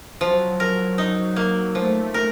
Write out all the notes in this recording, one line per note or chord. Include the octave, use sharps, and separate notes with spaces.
F3 F#3
A#4
D#4
A#3
F3 A3
A#4